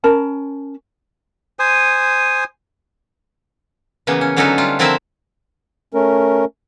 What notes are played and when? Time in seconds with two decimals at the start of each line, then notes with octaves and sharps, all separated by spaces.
0.04 C#4 A#4 A5 B5
1.59 C5 G#5 D#6
4.07 C#3 E3 A#3 B3
4.21 C#4
4.37 D3 F#3 C#4 D#4 A4 B4
4.58 G3 F4
4.79 D3 F3 C4 E4 A#4 E5
5.94 A3 C#4 A#4